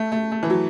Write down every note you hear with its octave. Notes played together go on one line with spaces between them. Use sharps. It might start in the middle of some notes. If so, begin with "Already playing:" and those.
Already playing: A3
A3
A3
E3
F#3